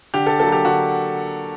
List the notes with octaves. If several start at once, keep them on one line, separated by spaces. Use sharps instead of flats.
D3 G4
A4
F#3 A#3 A4
G4
D3 F#4